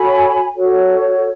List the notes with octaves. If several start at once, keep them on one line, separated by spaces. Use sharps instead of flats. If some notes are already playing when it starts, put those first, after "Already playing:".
Already playing: F#4 A4 C#5 G#5 B5
F#4 A4 C#5